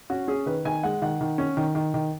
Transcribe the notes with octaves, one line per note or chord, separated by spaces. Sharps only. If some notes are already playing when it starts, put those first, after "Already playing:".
C#4 F#4
C#4 G#4
D#3 B4
D#3 G#5
G#3 F#5
D#3 F#5
D#3
C#4
D#3
D#3
D#3